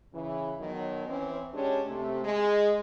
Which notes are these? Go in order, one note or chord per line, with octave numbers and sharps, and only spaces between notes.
C#3 E3
B2 D#3 F#3
E3 C4 C#4
G#3 C#4 D4 G4 C#5
C3 A3
G#3